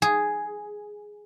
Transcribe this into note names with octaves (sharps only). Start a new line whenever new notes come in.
G#4